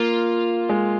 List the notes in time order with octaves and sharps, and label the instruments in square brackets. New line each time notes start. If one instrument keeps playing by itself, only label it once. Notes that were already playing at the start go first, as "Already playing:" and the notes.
Already playing: [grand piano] A#3 [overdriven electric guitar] F4
[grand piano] G#3